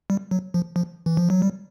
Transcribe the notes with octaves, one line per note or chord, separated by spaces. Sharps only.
G3
F#3
F3
F3
E3
F3
F#3
G3